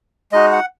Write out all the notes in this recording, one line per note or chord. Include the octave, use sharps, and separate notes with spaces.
G#3 D#4 F#4 D#5
F#5